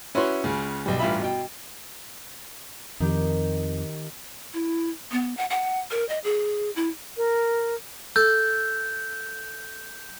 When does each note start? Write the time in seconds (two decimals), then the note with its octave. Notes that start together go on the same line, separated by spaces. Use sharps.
0.15 C#4 E4 F#4 B4 C#5 C6
0.44 C#2 C#3
0.86 B1 G3
0.99 A1 G2 F4 E5 B5
1.20 B2 G5
3.00 F2 D#3 G4
4.54 E4
5.12 B3
5.37 F#5
5.50 F#5
5.91 A#4
6.09 D#5
6.24 G#4
6.76 E4
7.17 A#4
8.16 A4 G6